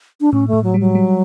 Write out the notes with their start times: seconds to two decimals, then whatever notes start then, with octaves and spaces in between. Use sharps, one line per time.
0.21 D4
0.33 A2 C#4
0.48 A3
0.53 A2
0.64 F#3
0.74 G3
0.80 F#3
0.95 G3